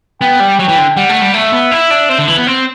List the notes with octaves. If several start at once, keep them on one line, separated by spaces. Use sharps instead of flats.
B3 G5
G3
F#3 G5
E3
D3
G3 F#5
A3
G3
A3 E5
B3
E4
D4
C4
D3
E3
B3
C4